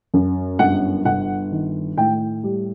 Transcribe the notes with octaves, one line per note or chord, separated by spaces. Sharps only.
F#2
G1 F#5
G1 F#5
D#3
A2 G5
G3